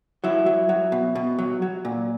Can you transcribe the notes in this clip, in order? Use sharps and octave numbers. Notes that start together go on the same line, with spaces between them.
F#3 E4
F#3
F#3
B2
B2
F#3
F#3
A#2